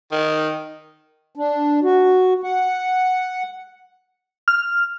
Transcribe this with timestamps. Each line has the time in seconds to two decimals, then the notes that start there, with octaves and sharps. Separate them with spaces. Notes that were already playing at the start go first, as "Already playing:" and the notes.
0.12 D#3
1.35 D4
1.83 F#4
2.43 F#5
4.48 F6